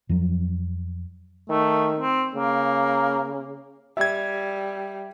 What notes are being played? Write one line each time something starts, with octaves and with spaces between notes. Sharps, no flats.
F2 F3 F#3
D#3 A3
C4
C#3 A#3
G3 E5 G#6